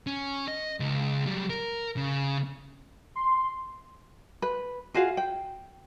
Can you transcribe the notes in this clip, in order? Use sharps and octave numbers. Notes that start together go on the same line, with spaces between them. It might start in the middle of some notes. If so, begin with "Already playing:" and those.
C#4
D#5
C#2
F#3 G3
A#4
C#3
C6
B4
F4 F#4 G#4 F5
G5